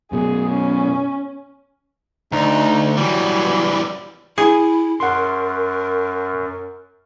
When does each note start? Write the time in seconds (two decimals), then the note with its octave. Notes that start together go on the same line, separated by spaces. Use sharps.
0.12 F#2 B2 G#4
0.49 C#4
2.32 D2 D#4
2.97 E3 F#3 G3
4.38 E4 G#4
5.00 F#2 A#4 F#5 C6